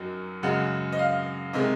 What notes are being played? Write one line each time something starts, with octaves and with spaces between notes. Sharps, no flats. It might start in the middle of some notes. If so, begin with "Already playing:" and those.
Already playing: F#2 D#3 F#3
F#2 C#3 G#3 F#5
D#5
F5
C3 D#3 G#3 D#5